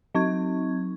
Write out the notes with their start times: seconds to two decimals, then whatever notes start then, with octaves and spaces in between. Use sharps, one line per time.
0.15 F#3 C4 D#4 C#6 G#6